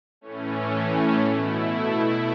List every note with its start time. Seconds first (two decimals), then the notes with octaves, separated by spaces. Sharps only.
0.21 A2 E3 A3 C#4
0.71 C#4
1.20 B2 A3 E4